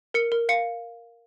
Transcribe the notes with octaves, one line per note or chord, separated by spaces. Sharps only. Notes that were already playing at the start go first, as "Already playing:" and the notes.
A#4 C#7
A#4
F5 C#7